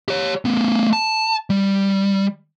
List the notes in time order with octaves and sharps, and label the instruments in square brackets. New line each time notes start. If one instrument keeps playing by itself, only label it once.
[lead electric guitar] G4 C#5
A3 B3
A5
G3